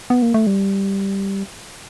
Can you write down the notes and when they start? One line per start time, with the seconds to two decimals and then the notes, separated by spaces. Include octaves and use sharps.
0.10 B3
0.22 A#3
0.34 A3
0.47 G3